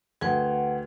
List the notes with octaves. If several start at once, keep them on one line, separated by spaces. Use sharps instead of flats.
D2 G#4 B4 F#5 G5 G#6